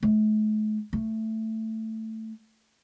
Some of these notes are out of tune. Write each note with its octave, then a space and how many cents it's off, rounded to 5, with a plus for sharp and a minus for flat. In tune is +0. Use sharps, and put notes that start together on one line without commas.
A3 -45
A3 +10